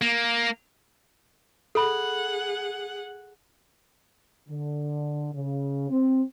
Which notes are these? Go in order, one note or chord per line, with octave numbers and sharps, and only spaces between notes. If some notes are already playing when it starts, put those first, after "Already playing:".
A#3
G#4 A4 F#5 B5
D3
C#3
C4